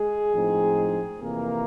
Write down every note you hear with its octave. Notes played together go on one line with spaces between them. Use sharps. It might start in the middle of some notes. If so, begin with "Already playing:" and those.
Already playing: G#3 G#4
A2 F3 G#3 C4 D#4
F2 C3 E3 A#3 A#4